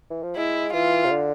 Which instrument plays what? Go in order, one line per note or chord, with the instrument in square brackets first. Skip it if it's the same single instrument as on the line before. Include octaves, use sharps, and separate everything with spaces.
[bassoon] E3
F3
[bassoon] G#3 [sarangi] E4
[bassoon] E3 [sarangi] F4
[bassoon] C3
D3